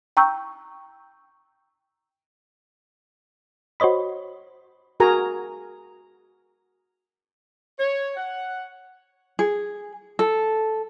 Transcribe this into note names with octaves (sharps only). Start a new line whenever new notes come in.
G5 A#5 C#6 E6 G6
F#4 C5 C#5 D#5 B5
F#4 G#4 A#4 G#5 A#5
C#5
F#5
G#4
A4